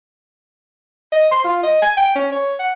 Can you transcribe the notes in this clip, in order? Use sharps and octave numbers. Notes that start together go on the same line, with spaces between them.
D#5
C6
F4
D#5
G#5
G5
C#4
C#5
F#5